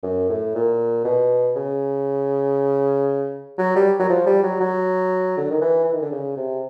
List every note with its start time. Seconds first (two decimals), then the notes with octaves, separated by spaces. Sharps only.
0.03 F#2
0.30 A2
0.55 A#2
1.04 B2
1.56 C#3
3.58 F#3
3.76 G3
4.00 F#3
4.10 F3
4.27 G3
4.43 F#3
4.60 F#3
5.38 D3
5.50 D#3
5.61 E3
5.85 E3
5.93 D#3
6.02 D3
6.12 C#3
6.37 C3